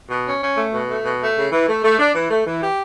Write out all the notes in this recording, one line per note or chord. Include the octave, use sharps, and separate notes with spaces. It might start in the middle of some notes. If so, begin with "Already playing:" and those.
B2
C#4
C#4
A3
B2
A3
B2
A3
C#3
E3
A3
A3
D4
E3
A3
E3
G4